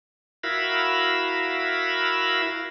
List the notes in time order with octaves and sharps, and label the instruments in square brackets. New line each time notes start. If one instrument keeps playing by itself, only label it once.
[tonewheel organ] E4 F#4 A#4 E5 F5 B5